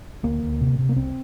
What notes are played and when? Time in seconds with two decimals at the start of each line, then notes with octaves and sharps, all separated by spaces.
0.23 D2 A#3
0.43 D2
0.61 C3
0.79 C3
0.89 A#3
0.96 C2 C4